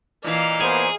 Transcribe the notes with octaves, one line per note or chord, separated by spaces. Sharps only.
A#2 E3 D#5 F5 F6
A#3 B3 G#4 C5